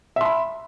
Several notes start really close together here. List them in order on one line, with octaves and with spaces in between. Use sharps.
E5 C6 B5